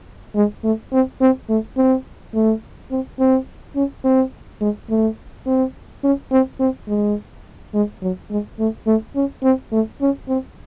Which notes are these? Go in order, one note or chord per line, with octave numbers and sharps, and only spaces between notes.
G#3
A3
C4
C4
A3
C4
A3
C4
C4
C#4
C4
G#3
A3
C4
C#4
C4
C4
G#3
G#3
F#3
G#3
A3
A3
C#4
C4
A3
C#4
C4